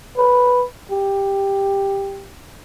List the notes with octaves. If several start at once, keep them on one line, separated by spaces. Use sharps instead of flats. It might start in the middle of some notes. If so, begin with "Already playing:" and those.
B4
G4